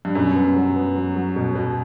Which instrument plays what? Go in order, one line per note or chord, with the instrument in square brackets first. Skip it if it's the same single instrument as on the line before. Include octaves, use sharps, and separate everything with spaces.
[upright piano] G2
[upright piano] F#2 [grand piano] B2
[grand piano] B3
F#3
B3
F#3
F#3
B2
B2